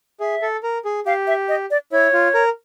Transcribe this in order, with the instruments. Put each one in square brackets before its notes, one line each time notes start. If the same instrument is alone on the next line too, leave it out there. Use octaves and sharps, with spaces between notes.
[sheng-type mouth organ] G#4 [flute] E5
[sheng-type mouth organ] A4
A#4
G#4
[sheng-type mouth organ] G4 [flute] F5
[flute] E5
D#5
D5
[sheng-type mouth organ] E4 [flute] C#5
[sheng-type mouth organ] F4
A#4